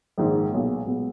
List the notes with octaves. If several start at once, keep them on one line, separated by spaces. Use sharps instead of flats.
A#1 G#2 D#3
B1 A#2 G#3 B3
B1 A#2 G#3 B3